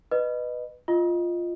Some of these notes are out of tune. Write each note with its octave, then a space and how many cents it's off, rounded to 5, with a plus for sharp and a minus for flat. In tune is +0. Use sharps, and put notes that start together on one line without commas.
B4 +0 D#5 -20
F4 -5 D#5 +0